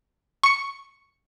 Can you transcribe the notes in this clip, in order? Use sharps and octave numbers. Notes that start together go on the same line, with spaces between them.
C#6 C#7